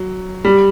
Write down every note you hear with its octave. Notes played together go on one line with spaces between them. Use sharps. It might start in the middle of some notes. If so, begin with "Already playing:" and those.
Already playing: F#3
G3